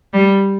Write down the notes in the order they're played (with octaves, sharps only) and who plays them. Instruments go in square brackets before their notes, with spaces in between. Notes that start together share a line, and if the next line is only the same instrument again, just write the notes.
[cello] G3